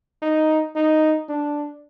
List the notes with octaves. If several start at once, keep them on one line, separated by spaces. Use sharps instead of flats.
D#4
D#4
D4